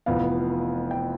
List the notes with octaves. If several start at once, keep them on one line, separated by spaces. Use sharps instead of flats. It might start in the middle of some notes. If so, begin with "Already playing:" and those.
F1 F2 E3 B3 F5
G5